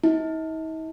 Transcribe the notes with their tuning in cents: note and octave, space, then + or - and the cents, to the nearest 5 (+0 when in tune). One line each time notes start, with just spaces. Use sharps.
D#4 +45